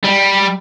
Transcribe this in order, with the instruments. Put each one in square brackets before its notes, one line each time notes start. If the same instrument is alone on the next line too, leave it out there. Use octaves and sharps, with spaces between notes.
[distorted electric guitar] G3